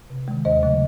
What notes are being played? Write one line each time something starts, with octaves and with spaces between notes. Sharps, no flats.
C3
D#3 G#3
D#2 C5 D#5
C#3 F#3 A3